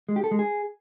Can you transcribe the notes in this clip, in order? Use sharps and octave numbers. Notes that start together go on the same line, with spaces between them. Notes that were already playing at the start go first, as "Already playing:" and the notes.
G#3
G4
A4
G#3
G#4